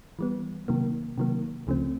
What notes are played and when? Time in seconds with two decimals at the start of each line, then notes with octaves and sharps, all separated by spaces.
0.19 E3 G3 B3
0.68 C3 D#3 F#3 A#3
1.18 C3 D#3 F#3 A#3
1.67 C#2 C#3 F3 A3 C4